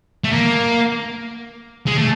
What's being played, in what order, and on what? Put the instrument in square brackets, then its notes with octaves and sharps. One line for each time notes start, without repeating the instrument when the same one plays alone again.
[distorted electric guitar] A3
A#3
G#3
A3